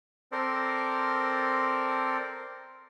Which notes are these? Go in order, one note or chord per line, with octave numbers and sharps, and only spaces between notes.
C4 A4 A#4 C5 D5